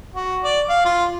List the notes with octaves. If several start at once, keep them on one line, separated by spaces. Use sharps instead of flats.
F#4
D5
F5
F4